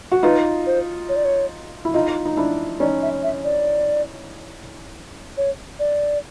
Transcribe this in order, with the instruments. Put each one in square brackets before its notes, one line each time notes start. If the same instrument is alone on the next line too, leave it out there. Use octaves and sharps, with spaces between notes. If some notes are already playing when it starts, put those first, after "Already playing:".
[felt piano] F#4
[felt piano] D#4 F4 [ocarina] B4
[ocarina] C5
C#5
D5
C#5
[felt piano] E4
[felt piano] D#4 F4 [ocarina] D#5
[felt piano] D#4
D4 E4
[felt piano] C#4 D#4 [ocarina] D5
[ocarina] E5
E5
D5
C#5
D5